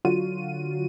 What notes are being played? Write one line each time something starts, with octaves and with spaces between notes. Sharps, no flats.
D3 F#3 F4 F#4 D#7